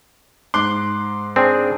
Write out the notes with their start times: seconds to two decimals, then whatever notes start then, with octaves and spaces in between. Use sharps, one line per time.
0.54 G#2 C6 D6 F#6 C7
1.36 C4 D4 G#4